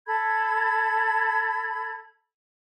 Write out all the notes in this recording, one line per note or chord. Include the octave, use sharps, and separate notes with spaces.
A4 B5 G#6